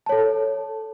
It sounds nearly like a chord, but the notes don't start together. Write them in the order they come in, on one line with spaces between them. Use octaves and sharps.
A5 C#5 A4